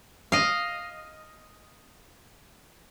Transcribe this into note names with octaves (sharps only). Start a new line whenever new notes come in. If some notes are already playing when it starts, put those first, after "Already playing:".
D#5 F5